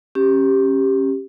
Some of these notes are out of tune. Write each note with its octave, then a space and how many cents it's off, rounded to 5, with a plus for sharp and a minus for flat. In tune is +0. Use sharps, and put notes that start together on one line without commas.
C#4 -25 G4 +0